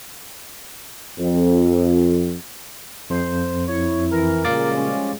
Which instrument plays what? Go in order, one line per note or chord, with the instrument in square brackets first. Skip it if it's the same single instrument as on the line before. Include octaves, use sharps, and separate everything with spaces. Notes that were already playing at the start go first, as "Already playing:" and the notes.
[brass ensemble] F2
[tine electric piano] F2 [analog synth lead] C5
[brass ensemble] E4 [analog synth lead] C#5
[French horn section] E3 [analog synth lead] A#4
[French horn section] A#2 C#3 [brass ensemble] F3 G3 G#3 [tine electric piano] F5 D6 A6
[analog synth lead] C#4